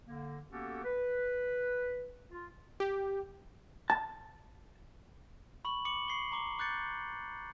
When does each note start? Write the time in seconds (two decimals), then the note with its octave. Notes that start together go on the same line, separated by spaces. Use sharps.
0.06 D3 A#3
0.50 A#3 B3 C#4 F#4 G4 A4
0.84 B4
2.31 F4
2.80 G4
3.90 A5
5.65 B5 C#6 F#7
5.85 D6 C#7 F#7
6.08 C#6 C7 G7
6.32 A#5 D6 G7
6.59 D6 F#6 G6 A6 C#7